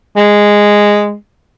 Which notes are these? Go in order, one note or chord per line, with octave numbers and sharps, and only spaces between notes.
G#3